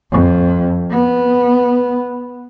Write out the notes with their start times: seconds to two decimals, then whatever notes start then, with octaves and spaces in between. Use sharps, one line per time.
0.11 F2
0.91 B3